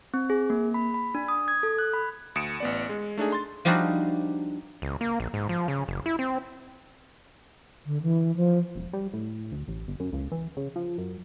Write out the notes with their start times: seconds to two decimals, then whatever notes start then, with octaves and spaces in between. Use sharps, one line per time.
0.14 C4
0.30 G#4
0.50 A#3
0.74 B5
0.94 B5
1.15 D4
1.28 D#6
1.48 G#6
1.63 A4
1.78 F#6
1.93 B5
2.35 D2 D#6 C#7 D7 E7
2.60 A1 B3 D5
2.89 G#3
3.17 A3 D4 D#4 G#4
3.32 C6 A6
3.65 F3 G3 D4 D#4 F4 F#4
4.82 C#2
5.01 A#3
5.20 A#1
5.34 G#2
5.49 F3
5.68 C#3
5.88 F#1
6.06 E4
6.19 C4
7.86 D3
8.02 E3
8.36 F3
8.75 E1
8.93 G3
9.13 A2
9.52 D2
9.68 A1
9.88 G1
10.00 F#2
10.13 C#2
10.32 E3
10.57 C#3
10.76 F3
10.98 F#2